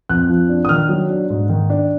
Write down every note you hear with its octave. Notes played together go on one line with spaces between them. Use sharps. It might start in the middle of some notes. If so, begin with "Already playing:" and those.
F2 F#6
F3
D4
D#6
D#3 F6
F#3
D4
G#2
D#3
D4